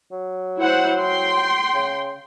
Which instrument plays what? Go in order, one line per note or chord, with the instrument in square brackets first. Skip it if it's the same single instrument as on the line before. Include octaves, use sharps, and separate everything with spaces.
[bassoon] F#3
[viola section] E4 C5 F#5
G5 C6
[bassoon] C#3